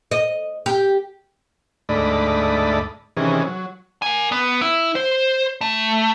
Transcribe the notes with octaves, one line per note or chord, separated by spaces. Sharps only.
D#5
G4
D2 G#2 A3 D5 D#5 B5
C3 D#3 E3 C#4 G#4
F#3
A#4 G#5
B3
E4
C5
A3